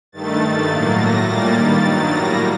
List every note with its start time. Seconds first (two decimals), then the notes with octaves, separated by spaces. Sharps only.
0.12 G2 D#3 A3 A6
0.40 G2 D#3 A3 A6
0.69 A2 F#3 A#3
0.97 A2 A3 A#6
1.25 A#2 G3 A#3 A6
1.53 G2 D#3 G3
1.82 G2 D#3 F#3
2.10 A2 G3 A#3 A#6